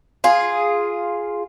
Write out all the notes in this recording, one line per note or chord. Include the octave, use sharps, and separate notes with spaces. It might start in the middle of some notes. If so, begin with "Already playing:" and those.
F4 G#4